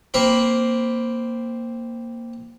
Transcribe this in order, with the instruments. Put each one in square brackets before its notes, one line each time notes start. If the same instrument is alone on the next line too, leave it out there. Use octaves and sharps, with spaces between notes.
[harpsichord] A#3 C4 B5